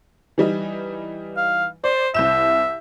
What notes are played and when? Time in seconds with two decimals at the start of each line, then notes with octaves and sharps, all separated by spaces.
0.38 E3 G3 D#4
1.37 F5
1.84 C5 D5
2.14 C2 E5 G6 E7